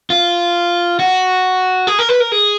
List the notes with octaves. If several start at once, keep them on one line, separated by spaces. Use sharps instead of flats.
F4
F#4
G#4
A#4
B4
A#4
G#4